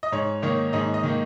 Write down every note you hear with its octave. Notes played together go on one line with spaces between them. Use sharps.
D#5
G#2 C#5
D#3 A#3 D#4 C#5
G#2 D#5
D#5
D#3 A#3 D#4